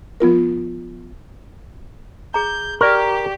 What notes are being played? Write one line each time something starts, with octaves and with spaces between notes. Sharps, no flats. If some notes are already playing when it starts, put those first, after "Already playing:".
F3 B3 F4 A#4
G#4 A#5 G6
G4 A#4 D5 C#6